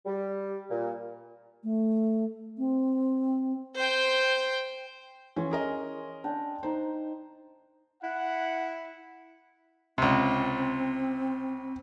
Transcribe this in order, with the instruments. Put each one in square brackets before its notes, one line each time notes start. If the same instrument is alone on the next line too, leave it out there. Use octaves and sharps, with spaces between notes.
[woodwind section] G3
A#2
[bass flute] A3
C4
[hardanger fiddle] C5 G5
[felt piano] E3 [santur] C#4 C6 C#6
[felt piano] G#4 A#4 D#5
[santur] D4 G5
[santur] D#4 D5 [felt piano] C5
[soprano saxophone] E4 [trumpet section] F#5
[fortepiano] C#2 C3 [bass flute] C4